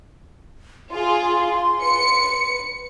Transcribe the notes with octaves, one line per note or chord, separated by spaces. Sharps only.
F4 G#4 C6
B4 C#7